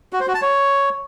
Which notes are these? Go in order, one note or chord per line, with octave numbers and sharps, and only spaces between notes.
F#4
C5
F#4
A5
C#5